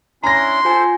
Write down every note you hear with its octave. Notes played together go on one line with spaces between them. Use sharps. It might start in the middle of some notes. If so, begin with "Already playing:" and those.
C#4 D4 E4 A#5 C6 A#6
F4 A4 C5 G#5